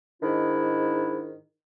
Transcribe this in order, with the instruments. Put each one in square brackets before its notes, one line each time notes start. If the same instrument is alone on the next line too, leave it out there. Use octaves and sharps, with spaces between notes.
[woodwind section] G#2 D#3 D4 E4